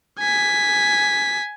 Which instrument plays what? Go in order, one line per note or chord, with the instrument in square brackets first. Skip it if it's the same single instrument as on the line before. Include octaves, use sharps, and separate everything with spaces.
[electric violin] G#5 B6